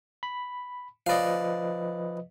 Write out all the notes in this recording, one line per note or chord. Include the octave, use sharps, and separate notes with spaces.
B5
F3 B4 D5 D#5 F5